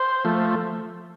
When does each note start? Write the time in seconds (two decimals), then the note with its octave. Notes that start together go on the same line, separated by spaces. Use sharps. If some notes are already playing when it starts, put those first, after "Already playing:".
Already playing: C5
0.25 F3 A3